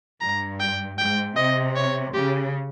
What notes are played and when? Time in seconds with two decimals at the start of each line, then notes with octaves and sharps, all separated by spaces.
0.21 G2 A#5
0.60 G5
0.98 G#2 G5
1.36 C3 D#5
1.76 C#5
2.14 C#3 G4